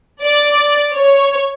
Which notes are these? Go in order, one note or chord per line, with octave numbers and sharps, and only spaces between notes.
D5
C#5